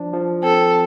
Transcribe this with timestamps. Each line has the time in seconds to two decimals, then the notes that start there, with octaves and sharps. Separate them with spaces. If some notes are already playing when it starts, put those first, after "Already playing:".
Already playing: F3 D4
0.13 F3
0.43 C4 A4